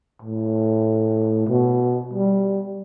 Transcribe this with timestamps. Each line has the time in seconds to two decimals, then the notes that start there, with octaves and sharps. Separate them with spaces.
0.22 A2
1.48 B2
2.14 G3